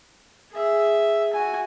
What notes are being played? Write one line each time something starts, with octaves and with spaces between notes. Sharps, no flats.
G#4 E5
F#4 G#5